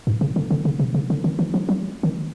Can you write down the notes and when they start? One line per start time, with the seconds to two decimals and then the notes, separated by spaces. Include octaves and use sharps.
0.07 G#2
0.21 C#3
0.36 D3
0.51 D3
0.65 C#3
0.79 C3
0.94 C#3
1.10 D3
1.24 D#3
1.39 E3
1.54 F3
1.69 F#3
2.03 D#3